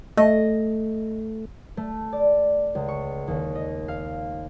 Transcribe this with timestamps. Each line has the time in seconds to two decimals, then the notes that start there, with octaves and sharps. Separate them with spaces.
0.17 A3 D#5
1.77 A3
2.13 D5
2.75 C#2
2.88 C#6
3.28 D#2
3.55 D#5
3.88 F5